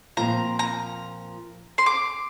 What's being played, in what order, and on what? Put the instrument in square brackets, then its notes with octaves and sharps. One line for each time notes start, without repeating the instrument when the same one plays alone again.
[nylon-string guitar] A#2 F3 C4 F4 [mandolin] A#5
[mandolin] A#5
C6
D6